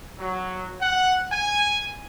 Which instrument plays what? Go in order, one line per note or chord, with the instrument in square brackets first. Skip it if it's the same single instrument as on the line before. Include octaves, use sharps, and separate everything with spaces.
[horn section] F#3
F#5
G#5